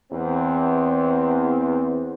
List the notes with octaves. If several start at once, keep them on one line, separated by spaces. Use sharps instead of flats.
E2 C4